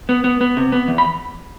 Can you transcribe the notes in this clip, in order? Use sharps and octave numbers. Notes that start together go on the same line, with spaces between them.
B3
B3
B3
C3
B3
E2
B5